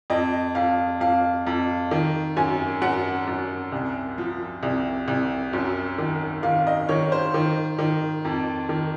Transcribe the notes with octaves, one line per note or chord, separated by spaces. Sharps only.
F2 D#5
F2 F5
F2 F5
F2
D#3
F#2 G#5
F#2 F#5
F#2
C2
F3
C2
C2
F#2
D#3
D#3 F5
D#5
D#3 C#5
C5
D#3
D#3
F2
D#3